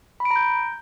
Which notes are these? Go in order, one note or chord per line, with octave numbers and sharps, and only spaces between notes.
B5
D7
A#5
G6